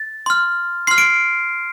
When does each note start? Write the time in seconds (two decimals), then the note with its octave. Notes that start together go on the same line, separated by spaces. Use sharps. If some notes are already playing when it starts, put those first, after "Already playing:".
Already playing: A6
0.26 C6 F6
0.87 C6 F6 C7
0.98 D7